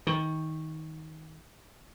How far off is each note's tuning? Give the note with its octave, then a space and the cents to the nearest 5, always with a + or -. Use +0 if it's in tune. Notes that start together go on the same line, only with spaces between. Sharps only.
D#3 +20